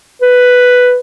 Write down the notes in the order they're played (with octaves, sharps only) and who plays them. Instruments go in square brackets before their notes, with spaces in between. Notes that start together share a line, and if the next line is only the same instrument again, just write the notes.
[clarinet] B4